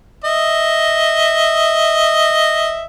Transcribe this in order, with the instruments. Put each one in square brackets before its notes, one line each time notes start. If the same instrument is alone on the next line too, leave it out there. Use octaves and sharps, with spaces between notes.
[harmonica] D#5 E5